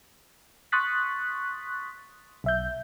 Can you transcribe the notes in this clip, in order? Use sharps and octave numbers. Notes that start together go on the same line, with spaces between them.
C6 C#6 D#6 F#6 A6 B6
B1 E5 G6